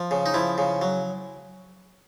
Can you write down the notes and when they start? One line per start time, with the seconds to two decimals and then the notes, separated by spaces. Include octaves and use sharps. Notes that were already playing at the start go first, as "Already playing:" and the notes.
Already playing: F3
0.11 C#3
0.26 D#4
0.34 F3 E4
0.58 C#3
0.82 F#3